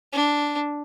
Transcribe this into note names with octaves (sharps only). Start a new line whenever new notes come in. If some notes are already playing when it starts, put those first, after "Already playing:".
D4